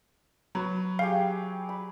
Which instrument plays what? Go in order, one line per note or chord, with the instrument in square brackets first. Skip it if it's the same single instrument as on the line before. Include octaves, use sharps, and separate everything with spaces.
[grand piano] F#3 [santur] B4
[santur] G4 G#4 G5 [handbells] F5
[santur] B5